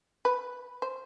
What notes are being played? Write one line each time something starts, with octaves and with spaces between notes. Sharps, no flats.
B4
C5